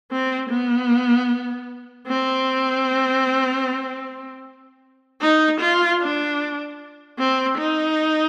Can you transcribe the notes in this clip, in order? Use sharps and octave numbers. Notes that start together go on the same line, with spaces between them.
C4
B3
C4
D#4
F4
D4
C4
D#4